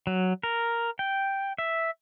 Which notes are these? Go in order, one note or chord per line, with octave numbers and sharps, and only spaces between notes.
F#3
A#4
G5
E5